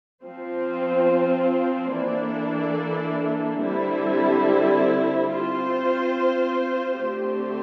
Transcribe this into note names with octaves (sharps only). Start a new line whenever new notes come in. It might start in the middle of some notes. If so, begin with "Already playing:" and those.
F3 C4 F4 C5
E3 A#3 D4 A4 D5
D3 G3 C4 E4
C4 F4 C5
D3 A3 C4 G4 C5